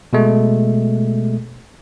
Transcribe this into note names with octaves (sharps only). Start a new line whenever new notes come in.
B2 G#3 A3